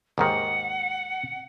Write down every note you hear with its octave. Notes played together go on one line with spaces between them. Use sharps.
D#2 G#2 D#3 F#5